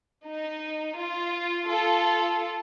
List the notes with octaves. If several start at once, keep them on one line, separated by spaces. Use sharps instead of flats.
D#4
F4
F4 A4